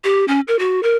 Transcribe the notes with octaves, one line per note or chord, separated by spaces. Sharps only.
G4
C#4
A#4
F#4
A#4